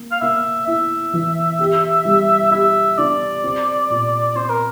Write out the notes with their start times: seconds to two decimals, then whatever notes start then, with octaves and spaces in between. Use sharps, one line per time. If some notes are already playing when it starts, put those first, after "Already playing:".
Already playing: A#3
0.11 F5
0.21 A#3 E5
0.67 E4 E5
1.13 E3
1.59 G4
2.05 G3
2.51 G4 E5
2.98 D4 D5
3.43 C4
3.90 A#2
4.35 C4 C5
4.49 A#4